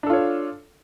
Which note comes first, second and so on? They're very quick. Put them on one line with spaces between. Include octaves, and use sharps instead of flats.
D4 A4 F4 C#5